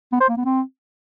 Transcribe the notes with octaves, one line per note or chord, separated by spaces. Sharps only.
B3
C5
A#3
B3
C4